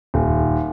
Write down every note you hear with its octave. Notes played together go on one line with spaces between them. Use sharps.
D#1